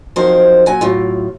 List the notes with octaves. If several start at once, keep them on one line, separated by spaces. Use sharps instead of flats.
F3 F#3 C4 D#4 A#4 C5
A#2 F#3 G#5
A2 F#3 F4